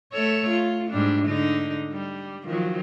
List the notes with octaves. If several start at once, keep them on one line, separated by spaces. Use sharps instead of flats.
A3 A4 C#5
F4
G#2 G3 D4
D3 D#4
G3
D#3 F3 F#3